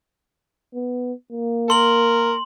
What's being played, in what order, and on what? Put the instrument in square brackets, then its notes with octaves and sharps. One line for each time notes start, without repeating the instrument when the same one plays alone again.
[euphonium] B3
A#3
[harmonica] A#4 [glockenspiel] C6 F#7